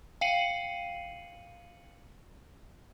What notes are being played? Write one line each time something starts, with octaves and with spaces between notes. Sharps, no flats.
F5 G5 C7 C#7 D#7 F#7